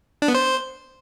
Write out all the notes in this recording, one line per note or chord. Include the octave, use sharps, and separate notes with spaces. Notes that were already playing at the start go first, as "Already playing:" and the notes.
D4
B3
C5